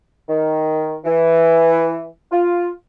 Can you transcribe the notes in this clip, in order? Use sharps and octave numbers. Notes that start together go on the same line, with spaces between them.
D#3
E3
F4